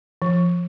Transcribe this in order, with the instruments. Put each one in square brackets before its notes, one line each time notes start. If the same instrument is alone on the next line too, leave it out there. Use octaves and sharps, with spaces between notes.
[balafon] F3